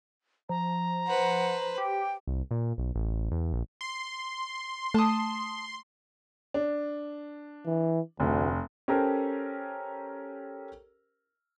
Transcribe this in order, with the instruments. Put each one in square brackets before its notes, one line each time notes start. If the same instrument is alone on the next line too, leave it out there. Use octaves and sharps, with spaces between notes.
[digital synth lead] F3 [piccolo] A#5
[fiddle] B4 C5 [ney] F#5
[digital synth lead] G4 [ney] G5
[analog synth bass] C2
A#2
B1
A1
E2
A#1
[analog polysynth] C6
[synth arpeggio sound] A3 [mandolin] A5 D#6
[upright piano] D4
[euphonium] E3
[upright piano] F1 [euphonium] D2
[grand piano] C#4 G4 A4 A#4 C5